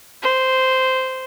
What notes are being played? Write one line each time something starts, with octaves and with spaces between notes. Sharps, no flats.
C5